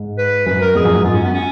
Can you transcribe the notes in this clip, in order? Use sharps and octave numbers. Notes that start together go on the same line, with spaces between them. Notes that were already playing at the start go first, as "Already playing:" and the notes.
Already playing: G#2
B4
F#2 B4
A#4
F2 G#4
F#2
G#2
F#2 F4
C#4
B3
C#4